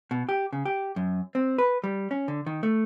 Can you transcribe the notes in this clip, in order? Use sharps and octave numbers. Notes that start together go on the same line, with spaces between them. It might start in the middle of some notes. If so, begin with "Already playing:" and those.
B2
G4
C#3
G4
F#2
C4
B4
G3
C#4
D3
D#3
A3